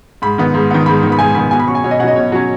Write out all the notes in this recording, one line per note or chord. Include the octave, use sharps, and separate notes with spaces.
G#2 B5
D#3 B3
G#2
D#3 B3
G#2 B5
D#3 B3
B5
G#2 G#5
D#3 B3 B5
B2 G#5
B5
F#3 C#4 C#6
G#5
B2 C#5
D#5
F#3 C#4 F#5
D#5
B2 C#5
F#3 C#4